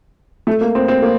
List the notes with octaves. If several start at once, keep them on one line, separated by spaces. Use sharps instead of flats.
A3
A#3
C4
C4
A#3